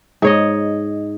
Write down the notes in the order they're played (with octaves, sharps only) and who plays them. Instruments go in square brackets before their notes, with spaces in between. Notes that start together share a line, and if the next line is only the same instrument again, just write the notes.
[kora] G#2 C#5 D#5